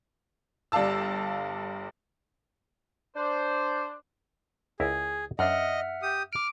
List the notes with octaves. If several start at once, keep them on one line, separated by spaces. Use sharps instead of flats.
G1 G3 D5 F5 A5 E6
D4 C5
C#2 E4 G#4 A#4
F#2 D4 D#5 E5 F#5 F6
G4 D#6
D6 F6 D7